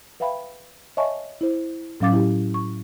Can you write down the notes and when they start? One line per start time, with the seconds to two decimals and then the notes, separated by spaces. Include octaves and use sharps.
0.20 B4 E5 F5 G5 B5
0.97 C#5 D#5 E5 G#5 A5 C#6
1.41 E4 C5
2.00 A2 F#3 C#4 F5 D6 A6
2.12 E4 G4
2.54 C#6